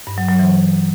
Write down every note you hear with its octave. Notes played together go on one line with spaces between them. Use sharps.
G2
F#3
F#3
E3